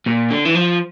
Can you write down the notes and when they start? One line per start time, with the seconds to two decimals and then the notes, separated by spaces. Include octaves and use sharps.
0.07 A#2
0.31 D3
0.45 E3
0.55 F3